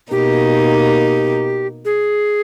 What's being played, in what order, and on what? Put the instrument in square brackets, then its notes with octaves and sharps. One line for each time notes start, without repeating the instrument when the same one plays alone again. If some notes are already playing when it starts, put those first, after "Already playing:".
[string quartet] B2 A#3 D#4 [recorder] G4
[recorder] G#4